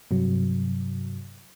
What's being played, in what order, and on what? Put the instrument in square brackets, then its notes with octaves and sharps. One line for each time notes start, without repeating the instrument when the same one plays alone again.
[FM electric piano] G2 C3 F#3